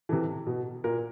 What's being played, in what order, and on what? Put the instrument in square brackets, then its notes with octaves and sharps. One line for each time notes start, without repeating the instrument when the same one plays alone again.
[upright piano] C3 E3 A4
B2
A#2 A#4